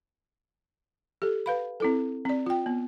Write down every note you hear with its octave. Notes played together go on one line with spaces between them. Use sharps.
G4 A4
B4 F5 B5
C4 E4 A4
C4 D5
F4 G5
B3